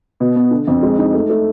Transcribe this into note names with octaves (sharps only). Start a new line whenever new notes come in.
B2
B3
D3
F2
G#3
D#4
A3
A3